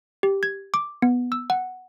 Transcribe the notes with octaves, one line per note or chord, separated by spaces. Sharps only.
G4
G#6
D6
B3
E6
F#5